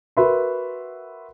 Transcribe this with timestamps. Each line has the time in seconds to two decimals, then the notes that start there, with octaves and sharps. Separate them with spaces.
0.17 F#4 A#4 B4 E5 B5 C6